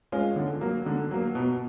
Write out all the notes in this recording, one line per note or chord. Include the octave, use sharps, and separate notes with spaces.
G#3 C#4 F4
D3
F#3 A#3
D3
F#3 A#3
B2